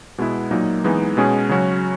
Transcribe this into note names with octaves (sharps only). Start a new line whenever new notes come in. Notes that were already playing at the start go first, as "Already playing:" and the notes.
B2 G#3 B3 E4
A#2 F#3 A#3 D#4
E3 G#3 B3 D#4
B2 G#3 C#4 G#4
C#3 F#3 C#4 F#4